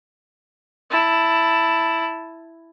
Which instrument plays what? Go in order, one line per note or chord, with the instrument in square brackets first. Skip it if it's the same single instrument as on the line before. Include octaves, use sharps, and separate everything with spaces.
[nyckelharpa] E4 A5